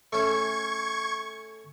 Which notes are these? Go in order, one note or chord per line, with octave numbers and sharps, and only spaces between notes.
A3 C#4 C#6 G#6